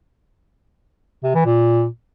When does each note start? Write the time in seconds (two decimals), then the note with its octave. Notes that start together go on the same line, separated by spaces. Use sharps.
1.24 C3
1.35 E3
1.46 A#2